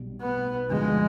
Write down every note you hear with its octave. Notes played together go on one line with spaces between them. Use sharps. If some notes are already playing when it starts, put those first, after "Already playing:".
Already playing: B1 B2 G3
B3
D2 D3 F3 G#3